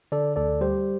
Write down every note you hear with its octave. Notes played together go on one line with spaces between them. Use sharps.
D3 A4 D5
D2 A4 D5
G3 G4 C5